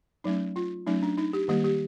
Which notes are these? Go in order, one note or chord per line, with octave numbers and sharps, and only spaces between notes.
F#3 A3 C#4 D#4
F4
F#3 A3 C#4 D#4
D4
D#4
G4
D#3 G3 A#3 G4
G4